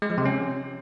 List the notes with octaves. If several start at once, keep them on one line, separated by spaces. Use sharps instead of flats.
G#3
F3
C3
C#4